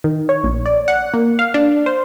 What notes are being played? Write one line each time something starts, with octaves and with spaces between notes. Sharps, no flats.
D#3
C#5
A#1
D5
F#5
A#3
F5
D4
C5